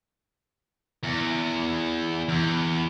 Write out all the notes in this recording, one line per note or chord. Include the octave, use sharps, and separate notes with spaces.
E2
E2